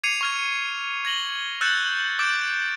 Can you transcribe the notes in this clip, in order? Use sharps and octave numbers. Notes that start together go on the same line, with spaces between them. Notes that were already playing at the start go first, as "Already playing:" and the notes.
D6 G#6 C7 C#7 D#7 F7
C#6 F6 G#6
G#6 A#6 F#7 G7
E6 F#6 G6 A6 C#7 E7
D6 E6 G6 A6 D7 E7